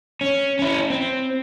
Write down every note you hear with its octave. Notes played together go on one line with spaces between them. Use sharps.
C#4
C#4 E4
C4